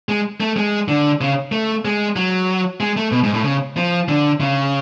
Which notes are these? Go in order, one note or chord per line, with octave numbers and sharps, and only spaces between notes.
G#3
A3
G#3
D3
C#3
A3
G#3
F#3
G#3
A3
B2
G#2
A2
C#3
F3
D3
C#3